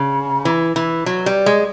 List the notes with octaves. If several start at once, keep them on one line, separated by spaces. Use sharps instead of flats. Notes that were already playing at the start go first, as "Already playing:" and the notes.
Already playing: C#3
E3
E3
F#3
G3
G#3